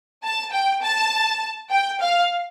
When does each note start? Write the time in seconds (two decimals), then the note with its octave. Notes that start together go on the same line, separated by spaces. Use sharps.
0.23 A5
0.52 G5
0.82 A5
1.70 G5
2.00 F5